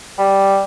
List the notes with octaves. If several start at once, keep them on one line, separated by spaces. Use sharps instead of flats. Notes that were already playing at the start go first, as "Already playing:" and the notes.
G3